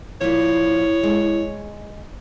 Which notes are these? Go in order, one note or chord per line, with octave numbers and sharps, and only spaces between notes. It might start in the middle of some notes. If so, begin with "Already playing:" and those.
A#2 F3 E4 C#5
G#3